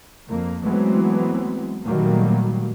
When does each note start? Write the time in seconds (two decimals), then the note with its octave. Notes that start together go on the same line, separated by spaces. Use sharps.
0.28 F2 A#3
0.63 E3 F#3 G#3 A3 B3 C4
1.85 A#2 D#3 F#3 G3 A3 A#3